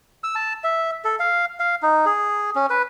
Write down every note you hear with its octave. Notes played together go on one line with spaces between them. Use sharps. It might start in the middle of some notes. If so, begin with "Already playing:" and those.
E6
A5
E5
A4
F5
F5
D#4
G#4
C#4
B4